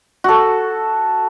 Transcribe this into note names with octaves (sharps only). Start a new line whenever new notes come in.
F#4 A4